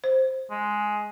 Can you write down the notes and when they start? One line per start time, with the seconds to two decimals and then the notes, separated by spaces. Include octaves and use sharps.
0.04 C5
0.51 G#3